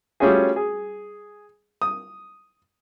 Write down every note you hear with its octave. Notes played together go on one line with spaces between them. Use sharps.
G3 A3 C#4 F4 F#4 G#4
G#4
D#6